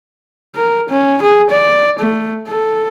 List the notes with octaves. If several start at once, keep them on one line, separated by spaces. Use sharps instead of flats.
A#4
C#4
G#4
D5
A3
A4